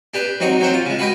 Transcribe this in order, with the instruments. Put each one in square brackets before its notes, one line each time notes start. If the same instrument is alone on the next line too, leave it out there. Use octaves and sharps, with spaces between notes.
[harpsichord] D4 G4 B4
F#3 C4 D#4 F#4
F#3 C4 C5 F#5
F4
C#3 G#3
F#4 B4 D#5 G5